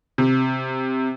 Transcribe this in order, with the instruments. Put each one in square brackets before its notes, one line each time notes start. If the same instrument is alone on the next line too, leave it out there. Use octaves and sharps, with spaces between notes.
[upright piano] C3